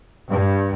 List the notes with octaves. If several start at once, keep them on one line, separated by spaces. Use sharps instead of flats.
G2